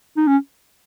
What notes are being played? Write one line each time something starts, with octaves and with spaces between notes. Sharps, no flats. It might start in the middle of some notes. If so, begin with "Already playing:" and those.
D#4
C#4